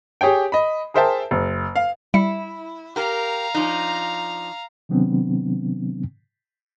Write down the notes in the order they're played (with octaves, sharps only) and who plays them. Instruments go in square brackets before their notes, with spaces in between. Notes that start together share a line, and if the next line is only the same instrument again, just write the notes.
[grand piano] G4 G#4 C#5 G5
D#5 B5
G#4 A#4 C5 E5 G5 A5
F#1
F5
[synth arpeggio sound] G3 E5 C#7 [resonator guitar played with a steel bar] E4
[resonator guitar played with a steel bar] G4 A#4 [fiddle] F5 A#5
[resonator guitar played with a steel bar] F3 D4 D#4
[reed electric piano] C3 D#3 F#3 B3 C4 D4